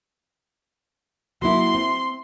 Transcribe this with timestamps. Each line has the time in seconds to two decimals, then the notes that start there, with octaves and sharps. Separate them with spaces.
1.42 F#3 A#3 E4 C6
1.75 C4